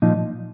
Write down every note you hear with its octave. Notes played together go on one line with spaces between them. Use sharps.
A#2 F3 D#4